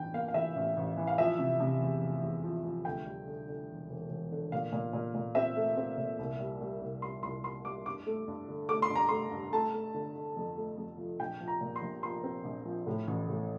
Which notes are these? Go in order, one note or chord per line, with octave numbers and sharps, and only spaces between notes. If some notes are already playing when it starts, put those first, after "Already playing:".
Already playing: A1 G2 E3 G5
A#3 F5
F5
E3 E5
A1
A1
E3
F5
F3 E5
C3
C3
E2
F1
E2
F3
F3
D2 G5
G3
D3
D3
E1
E1
E1
D3
A#2 F5
A#2
A#2
A#2
C4 E5
A3
C4
A#2
C2
G3
G3
C2
G3 C6
C2 C6
G3 C6
G3 D6
G2 D6
A3
G2
D3
A3 D6
C6
G2
A#5
A3 C6
G2
A3 A5
A3
D3
D3
F2
A3
F2
F3
A#1 G5
F3
A#5
A#2
C6
A#1
F3 C6
C4
A#1
F3
A2
A1
A2